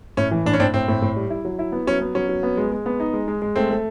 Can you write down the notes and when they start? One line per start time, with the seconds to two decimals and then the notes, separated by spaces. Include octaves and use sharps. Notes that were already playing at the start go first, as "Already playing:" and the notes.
0.17 A2 C#4
0.31 E3
0.46 A2 D4
0.53 C#4
0.60 A2 C4 D4
0.74 A2 C4
0.88 A2
1.02 A2
1.16 G3
1.30 E4
1.45 F#3
1.59 E4
1.72 B3
1.87 F#3 C#4
2.01 B3
2.15 F#3 C#4
2.29 F#3
2.43 B3
2.57 G#3
2.72 G#3
2.86 B3
3.00 D#4
3.13 G#3
3.28 G#3
3.42 G#3
3.56 A3 C4
3.70 A3